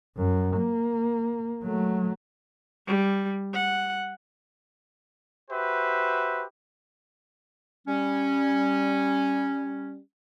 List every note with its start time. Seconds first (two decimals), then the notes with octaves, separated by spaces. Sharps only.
0.17 F#2
0.57 A#3
1.63 F#3 A3
2.87 G3
3.54 F#5
5.51 F#4 G4 B4 C5 E5
7.87 G3 C#4